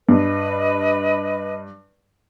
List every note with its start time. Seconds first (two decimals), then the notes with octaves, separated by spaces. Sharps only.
0.09 G2 B4 D#5